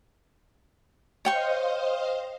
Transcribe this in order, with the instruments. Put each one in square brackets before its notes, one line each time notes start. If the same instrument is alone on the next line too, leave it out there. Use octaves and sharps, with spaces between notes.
[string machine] C5 D#5 F5 [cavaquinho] C#5 G5 C#6